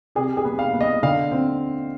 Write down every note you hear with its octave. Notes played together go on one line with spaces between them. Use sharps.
C3 G#4
G#4
B3
F5
B3
D#5
D3 F5
C4